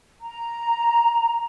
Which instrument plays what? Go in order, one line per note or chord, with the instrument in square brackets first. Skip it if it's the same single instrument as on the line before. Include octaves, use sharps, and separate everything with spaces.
[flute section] A#5